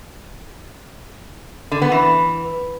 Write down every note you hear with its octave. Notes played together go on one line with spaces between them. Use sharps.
D3
B3
E3